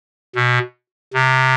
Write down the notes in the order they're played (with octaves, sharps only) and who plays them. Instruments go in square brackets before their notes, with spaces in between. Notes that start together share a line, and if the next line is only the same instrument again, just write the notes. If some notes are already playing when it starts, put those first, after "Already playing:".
[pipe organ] B2
C3